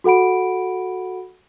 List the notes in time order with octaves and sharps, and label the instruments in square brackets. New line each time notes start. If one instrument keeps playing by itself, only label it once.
[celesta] F#4 A4 F#5 B5 D7